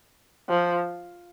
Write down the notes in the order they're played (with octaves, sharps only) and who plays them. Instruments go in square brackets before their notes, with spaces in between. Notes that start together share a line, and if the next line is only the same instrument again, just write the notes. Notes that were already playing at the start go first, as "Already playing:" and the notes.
[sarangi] F3